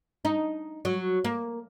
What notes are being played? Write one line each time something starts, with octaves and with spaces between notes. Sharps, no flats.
D#4
F#3
A#3